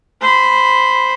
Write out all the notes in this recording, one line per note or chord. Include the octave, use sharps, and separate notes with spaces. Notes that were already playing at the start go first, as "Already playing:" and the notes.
C5 B5